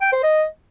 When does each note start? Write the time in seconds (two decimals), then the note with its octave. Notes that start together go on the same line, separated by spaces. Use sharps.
0.01 G5
0.12 C5
0.24 D#5